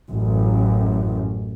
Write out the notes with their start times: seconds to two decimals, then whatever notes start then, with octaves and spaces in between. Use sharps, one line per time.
0.11 A1 F#2